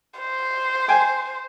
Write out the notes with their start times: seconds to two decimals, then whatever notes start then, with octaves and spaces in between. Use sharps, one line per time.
0.19 C5
0.88 G5 G#5